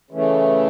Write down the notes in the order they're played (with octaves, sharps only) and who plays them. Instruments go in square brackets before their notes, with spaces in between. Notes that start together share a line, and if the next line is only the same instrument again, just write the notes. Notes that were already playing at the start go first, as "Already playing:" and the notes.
[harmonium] C#3 E3 A3